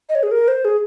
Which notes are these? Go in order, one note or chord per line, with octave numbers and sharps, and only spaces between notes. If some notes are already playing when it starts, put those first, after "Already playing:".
D#5
C#5
G#4
A#4
C5
G#4